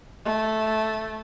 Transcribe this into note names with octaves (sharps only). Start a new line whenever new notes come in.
A3